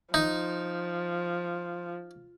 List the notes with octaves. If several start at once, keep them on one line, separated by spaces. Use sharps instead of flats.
F3 D#4